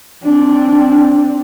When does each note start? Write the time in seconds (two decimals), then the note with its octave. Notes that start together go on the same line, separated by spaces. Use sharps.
0.24 C4 D4